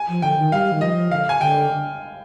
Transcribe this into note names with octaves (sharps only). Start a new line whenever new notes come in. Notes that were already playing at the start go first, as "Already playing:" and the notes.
Already playing: G#5
F3
D3 G5
D#3
G3 F5
D#3
F3 D#5
D3 F5
G#5
D3 G5